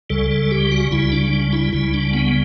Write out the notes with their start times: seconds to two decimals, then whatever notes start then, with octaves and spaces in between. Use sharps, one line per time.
0.10 C#2 C#3 G3 A4
0.31 A4
0.51 G4
0.71 F#4
0.91 C#2 C#3 G3 E4
1.12 D4
1.33 D4
1.53 E4
1.73 C#2 C#3 G3 E4
1.94 D4
2.13 B3